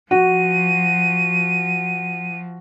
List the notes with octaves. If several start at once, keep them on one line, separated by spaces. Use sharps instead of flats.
F3 F#4 D#7